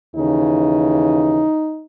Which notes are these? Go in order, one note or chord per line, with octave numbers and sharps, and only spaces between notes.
D#2 C#3 E3 D#4